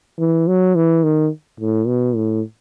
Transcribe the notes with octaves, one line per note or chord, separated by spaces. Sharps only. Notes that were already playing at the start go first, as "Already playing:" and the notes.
E3
F#3
E3
D#3
A2
B2
A2